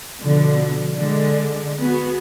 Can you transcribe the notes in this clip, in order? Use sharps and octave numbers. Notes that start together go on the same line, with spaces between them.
B2 D3 F3
D3 G#3
B3 F#4 G#4